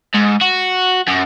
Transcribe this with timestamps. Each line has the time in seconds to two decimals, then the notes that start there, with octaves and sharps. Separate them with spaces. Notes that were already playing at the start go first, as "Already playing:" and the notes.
0.14 G#2
0.41 F#4
1.08 F#2